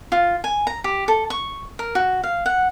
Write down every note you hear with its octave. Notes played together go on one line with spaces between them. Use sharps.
F4
G#5
A#5
G4
A4
C#6
A#4
F#4
F5
F#5